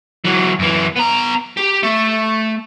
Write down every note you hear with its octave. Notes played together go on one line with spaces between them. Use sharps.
E3 F#3
F#2 E3
B3 A#5
G4
A3